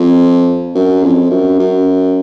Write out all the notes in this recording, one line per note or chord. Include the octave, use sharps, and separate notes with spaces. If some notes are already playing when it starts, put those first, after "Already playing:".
Already playing: F2
F#2
F2
F#2
F#2